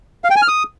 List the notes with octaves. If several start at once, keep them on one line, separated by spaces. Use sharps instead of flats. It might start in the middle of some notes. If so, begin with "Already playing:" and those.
F5
G5
G#5
F6
D#6